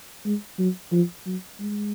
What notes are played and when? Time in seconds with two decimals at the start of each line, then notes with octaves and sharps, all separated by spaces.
0.25 G#3
0.59 F#3
0.92 F3
1.26 F#3
1.60 G#3